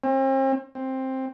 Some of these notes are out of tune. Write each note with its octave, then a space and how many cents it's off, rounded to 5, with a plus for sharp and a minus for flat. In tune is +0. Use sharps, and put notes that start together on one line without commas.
C4 +40
C4 +10